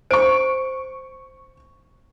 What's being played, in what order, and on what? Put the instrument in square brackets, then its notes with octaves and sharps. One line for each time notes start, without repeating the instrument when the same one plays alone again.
[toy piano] C5 [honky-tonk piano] C#6 D7